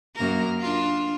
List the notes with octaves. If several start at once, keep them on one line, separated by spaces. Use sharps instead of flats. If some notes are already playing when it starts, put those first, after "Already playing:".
F#2 A#3 A#4
D4 F4